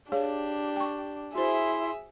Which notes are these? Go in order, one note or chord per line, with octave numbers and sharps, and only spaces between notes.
D4 G4 G#4 C#5 F5
G5 C#6
E4 F#4 G#4 C5 E5 C6